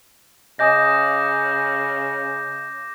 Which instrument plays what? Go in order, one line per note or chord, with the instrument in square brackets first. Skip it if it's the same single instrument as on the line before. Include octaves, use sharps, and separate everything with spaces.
[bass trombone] C#3 [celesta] D#5 G#5 D#6 [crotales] D6 G6 A#6